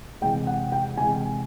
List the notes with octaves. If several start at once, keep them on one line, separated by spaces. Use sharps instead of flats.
C3 E3 G#3 G5
F#5
G5
C3 E3 G#3 G#5